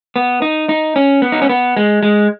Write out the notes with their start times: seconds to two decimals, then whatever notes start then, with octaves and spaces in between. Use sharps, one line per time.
0.16 B3
0.42 D#4
0.69 D#4
0.96 C#4
1.22 B3
1.32 D#4
1.42 C#4
1.50 B3
1.77 G#3
2.03 G#3